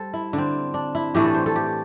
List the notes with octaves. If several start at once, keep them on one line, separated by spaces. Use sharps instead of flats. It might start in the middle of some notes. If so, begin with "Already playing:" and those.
Already playing: G3 A4 C5
E4
D3 C4
D4
E4
A2 E3 A3 D4 G4
A4
C5
A4
G4